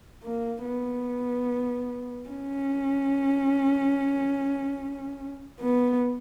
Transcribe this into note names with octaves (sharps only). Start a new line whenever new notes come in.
A#3
B3
C#4
B3